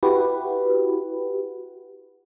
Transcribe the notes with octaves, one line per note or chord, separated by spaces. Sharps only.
E4 F#4 G4 B4